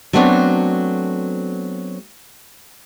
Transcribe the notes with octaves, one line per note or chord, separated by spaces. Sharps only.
F#3 A3 B3 C4 D4 F#4